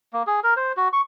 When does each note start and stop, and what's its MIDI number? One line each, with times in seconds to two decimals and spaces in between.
0.13 0.23 58
0.27 0.40 68
0.44 0.54 70
0.57 0.72 72
0.77 0.88 66
0.93 1.01 85